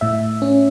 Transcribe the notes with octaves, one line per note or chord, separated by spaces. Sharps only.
A2 E5
C#4